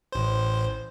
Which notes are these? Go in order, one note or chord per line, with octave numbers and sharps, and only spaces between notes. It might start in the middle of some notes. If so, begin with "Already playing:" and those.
A1 C5